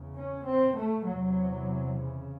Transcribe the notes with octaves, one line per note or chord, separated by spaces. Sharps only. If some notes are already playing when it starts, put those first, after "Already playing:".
Already playing: E2 C#3
C#4
C4
A3
E2 C3 F#3
C#3